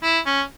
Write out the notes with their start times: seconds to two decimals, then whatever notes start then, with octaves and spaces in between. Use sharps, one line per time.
0.03 E4
0.26 C#4